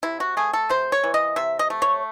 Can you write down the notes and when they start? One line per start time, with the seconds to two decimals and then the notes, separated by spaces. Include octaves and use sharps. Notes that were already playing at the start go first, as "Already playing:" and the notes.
0.03 C3 E4
0.20 F#4
0.37 A3 G#4
0.53 A4
0.69 C3 C5
0.92 C#5
1.04 E3
1.14 D#5
1.36 C3 E5
1.59 D#5
1.70 A3
1.82 C#5